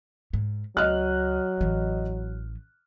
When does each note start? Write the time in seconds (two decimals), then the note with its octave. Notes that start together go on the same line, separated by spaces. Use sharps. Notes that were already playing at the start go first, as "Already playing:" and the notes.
0.33 G#2
0.77 C#2 F#3 D#5 F6 F#6
1.61 A1 E3